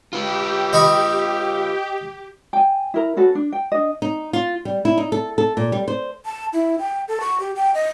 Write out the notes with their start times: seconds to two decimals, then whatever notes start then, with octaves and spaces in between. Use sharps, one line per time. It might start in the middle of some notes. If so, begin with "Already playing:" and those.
0.13 F4 G4 B4
0.73 D#5 B5 C#6
2.53 G5 G#5
2.94 E4 A#4 A#5
3.17 C#4 F#4 A4 B4
3.35 D4
3.52 G5
3.72 D4 D#5
4.02 D#4
4.33 F4
4.65 G3
4.85 E4
4.98 D#4
5.12 A4
5.38 A4
5.57 A#2
5.72 G3
5.88 C5
6.25 A5
6.53 E4
6.79 G5
7.08 A4
7.21 C#6
7.40 G4
7.56 G5
7.75 D#5